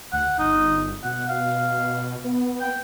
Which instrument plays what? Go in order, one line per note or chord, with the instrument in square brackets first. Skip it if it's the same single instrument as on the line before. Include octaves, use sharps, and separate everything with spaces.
[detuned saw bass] D2 [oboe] F#5
[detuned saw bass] G1 [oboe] D#4
[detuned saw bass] B2 [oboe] F#5
[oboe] F5
[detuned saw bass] B3
[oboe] G5